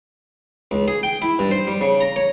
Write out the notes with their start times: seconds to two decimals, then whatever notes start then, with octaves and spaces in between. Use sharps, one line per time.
0.71 C#2
0.88 G#4
1.03 G5
1.22 E4
1.39 G2
1.51 C5
1.67 G3
1.81 C#3
2.01 A#5
2.16 C#5